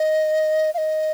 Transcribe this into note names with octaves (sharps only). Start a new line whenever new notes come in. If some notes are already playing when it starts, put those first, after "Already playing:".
Already playing: D#5
F5
D#5